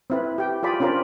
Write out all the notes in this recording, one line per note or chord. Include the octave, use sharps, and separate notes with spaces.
C4 E4 B4
G4 G5
F4 G#4 D5 B5
C#4 D4 F4 A#4 C5 D5